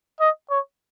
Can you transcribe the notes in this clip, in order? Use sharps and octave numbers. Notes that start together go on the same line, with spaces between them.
D#5
C#5